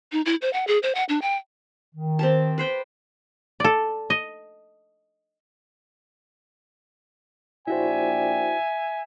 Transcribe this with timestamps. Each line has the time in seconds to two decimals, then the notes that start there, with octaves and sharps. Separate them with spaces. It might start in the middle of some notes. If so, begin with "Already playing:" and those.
0.12 D#4
0.25 E4
0.42 C5
0.53 F#5
0.67 G#4
0.83 C5
0.95 F#5
1.09 D4
1.21 G5
1.95 D#3
2.19 C4 G4 A5
2.58 B4 C5 G5
3.60 A4 D5
4.10 D#5
7.68 A#1 E4 F#4 C5 D5 E5 G5 G#5